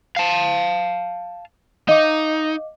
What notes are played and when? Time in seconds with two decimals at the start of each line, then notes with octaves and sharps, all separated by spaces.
0.16 F5 A5
1.89 D#4 D#5 F5 D6